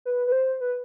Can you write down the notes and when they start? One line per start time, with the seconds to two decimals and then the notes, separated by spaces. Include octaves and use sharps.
0.05 B4
0.27 B4
0.32 C5
0.61 B4